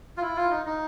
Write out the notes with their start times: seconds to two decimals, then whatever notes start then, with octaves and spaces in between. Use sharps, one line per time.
0.17 F4
0.22 E4
0.36 F4
0.51 D#4
0.66 D#4